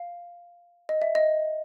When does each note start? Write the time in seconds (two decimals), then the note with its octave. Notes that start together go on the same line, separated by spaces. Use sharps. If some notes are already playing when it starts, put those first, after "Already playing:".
Already playing: F5
0.89 D#5
1.02 E5
1.15 D#5